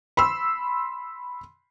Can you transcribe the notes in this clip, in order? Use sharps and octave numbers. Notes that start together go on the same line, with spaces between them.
B5 C6 E6